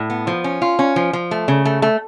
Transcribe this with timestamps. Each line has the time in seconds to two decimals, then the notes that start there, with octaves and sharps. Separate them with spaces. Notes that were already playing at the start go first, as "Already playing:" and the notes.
Already playing: A2
0.10 B3
0.27 F3
0.44 C#4
0.62 F4
0.79 C#4
0.96 F3
1.13 F3
1.31 A3
1.48 C#3
1.65 A3
1.82 A3